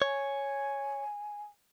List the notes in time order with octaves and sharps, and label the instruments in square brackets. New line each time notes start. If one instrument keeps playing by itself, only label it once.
[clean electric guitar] C#5 [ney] G#5